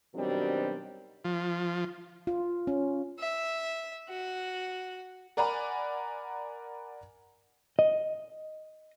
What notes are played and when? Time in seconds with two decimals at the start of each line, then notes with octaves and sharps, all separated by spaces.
0.15 B2 D#3 F#3 G3 C4 D4
1.24 F3
2.27 F4
2.67 C#4
3.19 E5
4.09 F#4
5.37 A#4 D5 F#5 G#5 A#5 B5
7.79 D#5